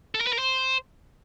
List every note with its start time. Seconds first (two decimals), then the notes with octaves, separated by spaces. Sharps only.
0.15 A4
0.21 A#4
0.27 B4
0.33 A#4
0.39 C5